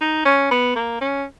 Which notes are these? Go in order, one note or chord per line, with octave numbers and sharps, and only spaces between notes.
D#4
C#4
B3
A#3
C#4